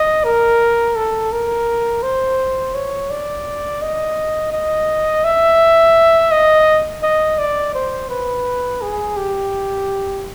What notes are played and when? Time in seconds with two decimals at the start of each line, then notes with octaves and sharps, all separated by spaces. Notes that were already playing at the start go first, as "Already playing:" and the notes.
Already playing: D#5
0.24 A#4
0.96 A4
1.32 A#4
2.03 C5
2.75 C#5
3.10 D5
3.82 D#5
4.53 D#5
5.24 E5
6.32 D#5
7.03 D#5
7.39 D5
7.74 C5
8.10 B4
8.82 G#4
9.17 G4